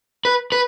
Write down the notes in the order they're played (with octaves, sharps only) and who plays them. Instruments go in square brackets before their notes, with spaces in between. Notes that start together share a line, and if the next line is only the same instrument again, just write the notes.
[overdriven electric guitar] B4
B4